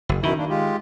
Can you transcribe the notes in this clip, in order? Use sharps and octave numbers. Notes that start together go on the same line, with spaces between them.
F#1
F#2 B2 D#3 E4
A#3 D4
G#3 F4 G4